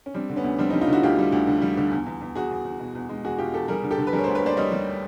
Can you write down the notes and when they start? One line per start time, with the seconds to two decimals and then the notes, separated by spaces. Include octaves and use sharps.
0.06 C#4
0.14 G3 C4 D4
0.29 D3
0.36 B3 C#4
0.44 D2
0.59 G3 C4 D4
0.70 C#4 D#4
0.74 G3
0.81 D#4 F4
0.88 D3 E4 F#4
1.03 D2 F4 G4
1.19 G3
1.32 D2
1.47 D3
1.62 G3
1.77 D3
1.91 E2
2.06 E2
2.21 E2
2.35 E2 F#4 G#4
2.51 E2
2.65 E2
2.80 B2
2.95 E2
3.09 G#3
3.24 E2 F#4 G#4
3.38 B2 F4 G4
3.54 E2 G4 A4
3.68 G3 G#4 A#4
3.83 D3
3.91 G4 A4
3.98 D3
4.07 B4
4.13 G3 G#4 A#4
4.19 C#5
4.24 A#4 C5
4.27 D2
4.35 B4 C#5
4.42 A#3 C5 D5
4.57 G3 C#5 D#5
4.72 G3